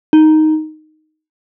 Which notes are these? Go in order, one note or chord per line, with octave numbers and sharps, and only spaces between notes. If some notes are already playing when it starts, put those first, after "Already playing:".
D#4